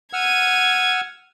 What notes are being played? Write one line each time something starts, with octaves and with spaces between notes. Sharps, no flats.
F#5 E6 F6 G#6 D#7